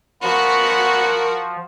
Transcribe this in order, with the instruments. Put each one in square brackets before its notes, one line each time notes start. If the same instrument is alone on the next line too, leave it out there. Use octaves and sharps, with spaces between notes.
[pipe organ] F3 [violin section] F#4 [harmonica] A#4 F#5 B5